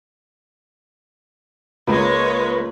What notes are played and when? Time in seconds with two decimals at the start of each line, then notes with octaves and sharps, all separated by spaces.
1.87 C#2 G#3 A#3 B4 C#5